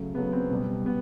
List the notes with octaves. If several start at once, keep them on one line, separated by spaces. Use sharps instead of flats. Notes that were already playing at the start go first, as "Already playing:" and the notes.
Already playing: C#3 F#3 A3
C#3 F#3 A3 B3
C4
B2 G3
B2 B3